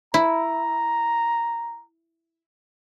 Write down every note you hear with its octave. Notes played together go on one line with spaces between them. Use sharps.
E4 A#5